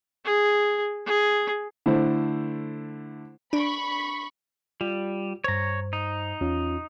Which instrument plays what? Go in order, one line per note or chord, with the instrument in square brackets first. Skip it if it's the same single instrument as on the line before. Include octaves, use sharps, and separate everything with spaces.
[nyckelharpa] G#4
G#4
[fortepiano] D3 A3 E4 C5
[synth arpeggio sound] D4 [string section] B5 C#6
[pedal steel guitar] G3 [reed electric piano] F4
[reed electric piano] G2 C5 [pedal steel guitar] C#5 A#5
[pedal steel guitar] D#4
[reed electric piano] E2 C#4 F4